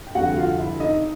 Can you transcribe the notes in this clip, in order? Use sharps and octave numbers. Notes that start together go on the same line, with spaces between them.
G5
F1 F2 D3 G3 F#4 F#5
F4 F5
E4 E5
D#4 D#5